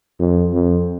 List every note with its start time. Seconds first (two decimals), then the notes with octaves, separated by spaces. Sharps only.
0.19 F2
0.53 F2